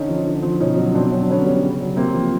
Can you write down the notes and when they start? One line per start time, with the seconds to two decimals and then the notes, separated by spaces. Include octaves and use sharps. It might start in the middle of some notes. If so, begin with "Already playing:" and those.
Already playing: D3 C#4 D#4
0.08 F3
0.26 D3
0.43 F3
0.60 B2 C#4 D#4
0.77 F#3
0.94 B2 C4 D4
1.11 F#3 C#4
1.20 D4
1.29 D3 B3 C#4
1.46 G3
1.63 C#3
1.80 F#3
1.96 C3 A#3 C4
2.14 F3